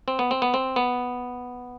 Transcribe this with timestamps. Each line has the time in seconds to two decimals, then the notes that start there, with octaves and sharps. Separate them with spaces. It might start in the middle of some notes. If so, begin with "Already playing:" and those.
0.08 C4
0.19 B3
0.31 C4
0.42 B3
0.54 C4
0.76 B3